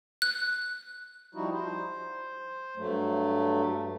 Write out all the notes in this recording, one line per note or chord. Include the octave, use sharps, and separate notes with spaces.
F#6
F3 G3 D#4 E4 F#4
C5
G2 F#3 A3